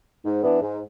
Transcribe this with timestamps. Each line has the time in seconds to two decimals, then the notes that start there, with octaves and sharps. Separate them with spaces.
0.25 G#2
0.42 E3 B3 D4
0.61 G#2